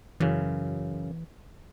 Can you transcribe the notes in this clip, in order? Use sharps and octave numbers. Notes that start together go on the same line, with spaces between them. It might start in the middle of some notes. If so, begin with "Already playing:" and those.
F#2 C#3 E3